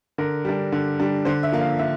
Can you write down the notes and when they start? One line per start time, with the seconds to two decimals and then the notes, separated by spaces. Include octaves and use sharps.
0.18 D3 A#4
0.45 G3 D4
0.72 D3
1.00 G3 D4
1.25 D3 C5
1.43 E5
1.52 F3 A#3
1.61 F5
1.79 D3 E5